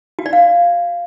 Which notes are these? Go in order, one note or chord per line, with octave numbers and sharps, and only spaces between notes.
F#4
D5
F5